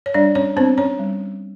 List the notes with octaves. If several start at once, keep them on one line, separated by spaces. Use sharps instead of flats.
C#5
G3 D4 D5
C#4 C#5
B3 C4 D4 C5
C#4 C#5
G3